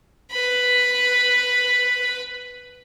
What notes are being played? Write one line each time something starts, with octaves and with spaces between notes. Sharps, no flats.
B4 B5